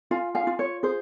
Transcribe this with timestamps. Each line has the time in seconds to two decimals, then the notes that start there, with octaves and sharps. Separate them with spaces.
0.11 F4 F5 G#5
0.35 F5 G#5
0.47 F4
0.59 C#5
0.83 G#4 C5